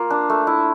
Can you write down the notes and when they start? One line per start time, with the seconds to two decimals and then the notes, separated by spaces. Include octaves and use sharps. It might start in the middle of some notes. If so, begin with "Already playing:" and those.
Already playing: A#3 F4
0.10 D4
0.30 A3
0.47 E4